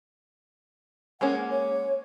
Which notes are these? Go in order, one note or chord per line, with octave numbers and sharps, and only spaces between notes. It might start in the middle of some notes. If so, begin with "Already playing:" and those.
G#3 A#3 C#4 F#5
C#5